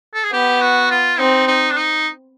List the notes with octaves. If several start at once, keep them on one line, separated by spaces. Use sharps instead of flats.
A4
G#4
B3 G4
F#4
F4
C4 D#4
D#4
D4
D#4